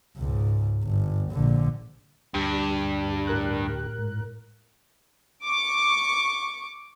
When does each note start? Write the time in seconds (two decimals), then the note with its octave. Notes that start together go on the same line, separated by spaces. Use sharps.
0.17 C#2 G#2
0.83 G1
1.32 A#1 D3
2.34 D2 G2 G4
3.27 A2 A#4 F#6
3.98 G#2
5.45 C#6 D6